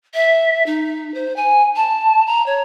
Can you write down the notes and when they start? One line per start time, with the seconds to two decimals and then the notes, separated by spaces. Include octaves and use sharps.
0.14 E5
0.66 D#4
1.14 C5
1.36 G#5
1.76 A5
2.27 A#5
2.46 C#5